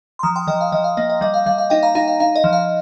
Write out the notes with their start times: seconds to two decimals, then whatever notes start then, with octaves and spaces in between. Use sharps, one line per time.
0.19 C6
0.23 F3 A#5 D#6
0.35 G5 C6
0.47 F3 D#5 G5
0.61 F5
0.72 F3 D#5
0.84 F5
0.97 A#3 D#5
1.10 D#5
1.21 G3 D#5
1.34 F5
1.46 G3 F5
1.58 F5
1.70 D#4 D#5 G5
1.83 F5 A#5
1.95 D#4 F5 A#5
2.08 F5
2.20 D#4 F5
2.36 D#5
2.44 F3
2.53 F5